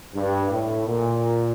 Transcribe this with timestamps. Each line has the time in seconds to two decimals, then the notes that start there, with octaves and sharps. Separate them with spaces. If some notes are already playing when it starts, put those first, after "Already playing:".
0.15 G2
0.51 A2
0.87 A#2